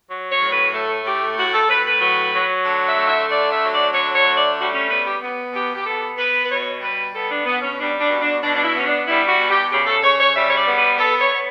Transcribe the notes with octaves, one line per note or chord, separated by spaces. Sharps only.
F#3
C#5
A2
B4
A3 A4
A2 G4
A2 F#4
A4
A2 B4
B4
F#3 B4
F#3
D3
E5
A3
E5
D3 D5
E5
F#3
D5
D3 C#5
C#5
A3
D5
G3 F#4
C#4
B3 B4
G4
B3
B2 G4
G4
B3 A4
B3 B4
B4
B2 C#5
G3 B4
B3 A4
D4
B2 B3
C#4
G3 D4
D4
B2
D4
B2 D4
D4
E4
B3
C#4
D4
G3 E4
F#4
B2
G4
C#3 G4
A4
C#3 C#5
C#5
G3 E5
C#5
D5
B3
B4
B3 A4
C#5
B3